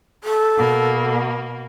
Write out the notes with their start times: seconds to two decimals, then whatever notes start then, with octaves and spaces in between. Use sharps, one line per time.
0.24 A4
0.58 B2 A#3